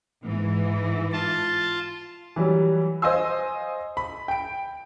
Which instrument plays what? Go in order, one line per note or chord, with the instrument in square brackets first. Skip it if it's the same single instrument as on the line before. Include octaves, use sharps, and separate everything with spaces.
[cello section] G#2 E3
[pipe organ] F4 A5
[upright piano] E3 F#3 G3
C5 D#5 F5 G#5 C6 E6
B5
G5 D7